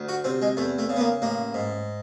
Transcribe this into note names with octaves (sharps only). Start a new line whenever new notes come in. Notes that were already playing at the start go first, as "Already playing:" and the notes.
Already playing: D2
F#4
C3 C4
G#3
E2 A3
A3
C#3
B3
A#3
A1 A#3
G#2